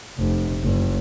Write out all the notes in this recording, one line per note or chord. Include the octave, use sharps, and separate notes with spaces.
F1
F#1